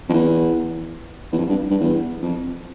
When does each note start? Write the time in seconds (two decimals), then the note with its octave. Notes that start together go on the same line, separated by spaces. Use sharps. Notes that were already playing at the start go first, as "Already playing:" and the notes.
0.09 F2
0.13 E2
1.32 E2
1.39 F2
1.49 G2
1.70 G2
1.81 E2
2.22 F2